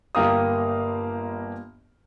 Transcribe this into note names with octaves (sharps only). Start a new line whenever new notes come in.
G1 A#3 G4 F5 A#5 D#6